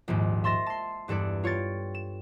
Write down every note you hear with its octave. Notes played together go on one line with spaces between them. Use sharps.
A#1 D#2 G#2
E5 C6 A6 A#6 E7
A5 C6
E2 G2 A4 B4 D5
F4 C#5 G5 A6
E7